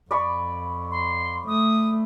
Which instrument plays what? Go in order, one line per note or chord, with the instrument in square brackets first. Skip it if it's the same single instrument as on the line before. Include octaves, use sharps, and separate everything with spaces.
[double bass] F2 [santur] D5 B5 C#6
[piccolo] C6
[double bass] A3 [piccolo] D#6